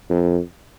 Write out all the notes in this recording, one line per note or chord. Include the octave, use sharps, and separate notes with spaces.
F2